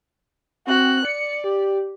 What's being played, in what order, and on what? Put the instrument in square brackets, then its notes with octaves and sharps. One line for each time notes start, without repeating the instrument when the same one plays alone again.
[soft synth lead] C4 [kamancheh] F#4 F#6
[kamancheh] D5 [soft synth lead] C#7
[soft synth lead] G4